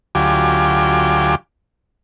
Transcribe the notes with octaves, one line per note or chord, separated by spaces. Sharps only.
D2 F#3 F4 G4 G#5 D6